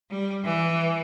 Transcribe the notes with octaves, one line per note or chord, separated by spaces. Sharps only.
G3
E3